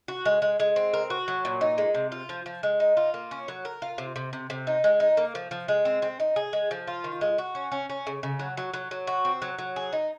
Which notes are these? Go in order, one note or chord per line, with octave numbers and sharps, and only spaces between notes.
F#4
G#3
G#3
G#3
C4
A#4
F#4
F#3
A#2
D#4
G#3
C3
F4
F3
F3
G#3
D#4
F4
A#3
C#4
F#3
A#4
F4
C3
C3
C3
C3
D#4
G#3
D#4
A#3
F3
F3
G#3
C4
C4
D#4
G#4
G#3
F3
F4
D#3
G#3
F#4
C#4
C#4
C#4
C#3
C#3
F#3
F#3
F#3
F#3
F#4
C4
F#3
F#3
G#4
D#4